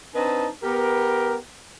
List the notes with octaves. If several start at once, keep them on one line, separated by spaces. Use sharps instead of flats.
C4 D4 D#4 B4 D#5 A5
B3 G4 A#4